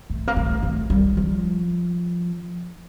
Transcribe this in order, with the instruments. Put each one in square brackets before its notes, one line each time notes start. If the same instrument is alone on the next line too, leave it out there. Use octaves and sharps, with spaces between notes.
[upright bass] A3
A#3
A3
A3
G3
F3